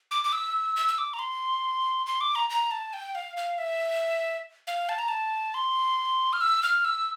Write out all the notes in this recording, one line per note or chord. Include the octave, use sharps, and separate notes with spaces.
D6
D6
E6
E6
E6
D6
A#5
C6
C6
D6
A#5
A#5
A5
G5
F5
F5
E5
F5
A5
A#5
A5
C6
F6
E6
F6
E6